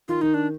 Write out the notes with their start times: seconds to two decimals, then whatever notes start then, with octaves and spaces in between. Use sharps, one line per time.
0.08 D#3 F4
0.21 D#3 D#4
0.34 D4